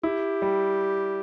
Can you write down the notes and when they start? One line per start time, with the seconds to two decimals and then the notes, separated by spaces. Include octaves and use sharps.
0.03 E4 G4
0.42 G3